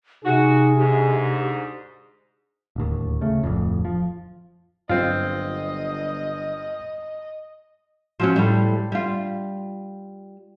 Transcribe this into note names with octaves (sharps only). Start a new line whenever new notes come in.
C3 D#4 F#4 G#4
D2 G#2 G4
D1 D#2
C#3 A3
D1 F2
F3
G1 G2 F#3 C4 F4 D#5
F3 F#3 C#4
A2 G3
G3 F4